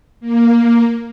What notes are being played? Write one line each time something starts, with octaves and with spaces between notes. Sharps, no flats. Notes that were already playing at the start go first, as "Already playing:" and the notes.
A#3